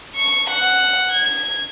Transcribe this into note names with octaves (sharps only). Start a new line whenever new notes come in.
C#6
F#5
G#6